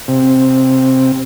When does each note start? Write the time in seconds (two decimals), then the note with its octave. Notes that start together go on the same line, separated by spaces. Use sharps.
0.08 C3